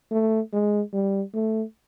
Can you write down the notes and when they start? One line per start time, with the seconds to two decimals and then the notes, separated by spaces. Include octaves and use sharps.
0.12 A3
0.53 G#3
0.93 G3
1.34 A3